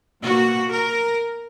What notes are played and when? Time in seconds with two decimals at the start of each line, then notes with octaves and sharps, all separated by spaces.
0.22 B2 A#3 F#4
0.70 A#4